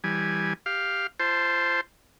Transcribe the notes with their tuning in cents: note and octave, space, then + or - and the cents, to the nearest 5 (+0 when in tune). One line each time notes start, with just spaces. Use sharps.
E3 -20 G3 +0 G#5 +0
G4 +0 F5 +0
F4 -45 C5 +0 A5 -5